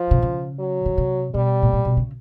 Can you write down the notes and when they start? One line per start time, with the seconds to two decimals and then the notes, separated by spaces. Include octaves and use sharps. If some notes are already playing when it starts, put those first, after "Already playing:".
Already playing: F3
0.11 C3
0.22 C#3
0.59 F#3
0.86 C#3
0.98 C3
1.34 B2 G3
1.62 A2
1.73 A#2
1.85 B2
1.97 C#3